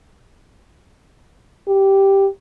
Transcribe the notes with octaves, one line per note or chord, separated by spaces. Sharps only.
G4